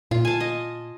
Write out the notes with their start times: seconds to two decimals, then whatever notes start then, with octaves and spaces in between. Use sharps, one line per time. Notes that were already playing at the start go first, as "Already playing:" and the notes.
0.11 A#2 F4
0.25 G#5 A5
0.40 D#5